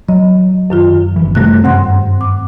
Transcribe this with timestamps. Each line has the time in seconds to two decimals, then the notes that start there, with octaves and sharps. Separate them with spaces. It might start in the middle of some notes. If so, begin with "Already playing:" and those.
0.09 F#3 D#5
0.70 F#2 D#3 F4
1.16 F#1 E3
1.35 F#2 C3 G3 A3 F#6
1.64 G2 C4 F#5 C6
2.21 D6